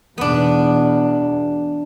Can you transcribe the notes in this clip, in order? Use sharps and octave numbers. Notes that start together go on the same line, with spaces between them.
E2 B2 B3 D4